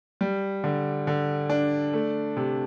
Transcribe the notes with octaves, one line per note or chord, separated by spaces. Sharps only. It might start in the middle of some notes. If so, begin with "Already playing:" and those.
G3
D3
D3
D4
A3
C3